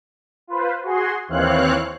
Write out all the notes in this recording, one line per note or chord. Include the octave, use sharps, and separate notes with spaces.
F4 B4 C5
F#4 G#4 C6
D#2 E3 C4 C#5 F5 F#6